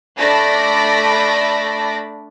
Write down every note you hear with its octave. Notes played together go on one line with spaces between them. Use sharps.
A3 D4 D5 B5 A#6